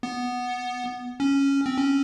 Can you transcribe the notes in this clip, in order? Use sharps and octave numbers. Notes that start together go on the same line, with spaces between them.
B3
C#4
C4
C#4